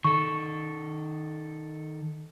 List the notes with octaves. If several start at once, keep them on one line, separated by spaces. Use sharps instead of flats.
D#3 A4 C#6